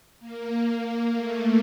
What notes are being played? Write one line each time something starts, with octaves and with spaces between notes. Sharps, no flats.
A#3
A3